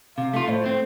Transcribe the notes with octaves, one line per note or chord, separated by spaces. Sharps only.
C3 F5
A3 F4 F5
A2 C5
A3 C4